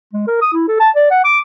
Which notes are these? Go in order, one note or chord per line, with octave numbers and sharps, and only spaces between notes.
G#3
A#4
D#6
E4
A4
A5
D5
F#5
D6